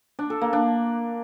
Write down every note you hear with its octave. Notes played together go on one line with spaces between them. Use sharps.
D4
A4
A#3
D4